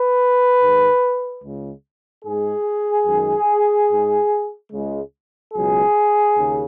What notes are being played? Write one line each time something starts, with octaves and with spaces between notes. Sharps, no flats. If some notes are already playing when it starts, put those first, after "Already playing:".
Already playing: B4
G#2 D#3 G#3
C#2 C#3 G#3
G#2 G#3 G#4
F#2 D#3 G#3
G#2 G#3
C#2 C#3 G#3
C#2 B2 F#3 G#4
D#2 C#3